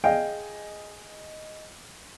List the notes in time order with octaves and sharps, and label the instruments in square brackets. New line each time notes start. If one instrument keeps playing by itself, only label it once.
[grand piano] G#4 D#5 G#5 [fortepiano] F5 G5